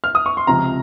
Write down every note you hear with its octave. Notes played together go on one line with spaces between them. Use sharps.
F6
D#6
C#6
C6
C#2 C3 F3 A#5